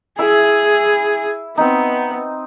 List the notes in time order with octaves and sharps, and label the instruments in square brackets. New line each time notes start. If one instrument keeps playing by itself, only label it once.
[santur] E4 E5 [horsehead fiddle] G#4
[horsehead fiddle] B3 [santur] C4 D#4